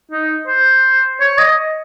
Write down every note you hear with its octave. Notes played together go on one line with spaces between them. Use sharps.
D#4
C5
C#5
D#5